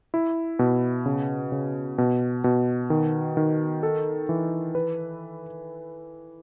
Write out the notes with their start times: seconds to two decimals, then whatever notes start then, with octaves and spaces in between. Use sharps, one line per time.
0.14 E4
0.59 B2
1.06 C#3
1.52 C#3
1.98 B2
2.44 B2
2.90 D#3
3.37 D#3
3.83 A4
4.29 E3
4.75 B4